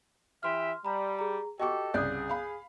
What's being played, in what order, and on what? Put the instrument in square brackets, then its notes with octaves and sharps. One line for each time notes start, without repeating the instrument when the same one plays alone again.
[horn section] E3 G4 E5 [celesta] C6 F6
[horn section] G3 [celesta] A#5 B5
[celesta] G#4 A#5
[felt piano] F#4 C#6 [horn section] G4 A4 [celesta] D#5 G5 D6
[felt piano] C2 C#3 D5 [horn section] G#4 [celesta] D#6 F#6 G6
[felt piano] F5 B5